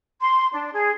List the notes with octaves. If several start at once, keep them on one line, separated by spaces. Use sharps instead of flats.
C6
D4
G#4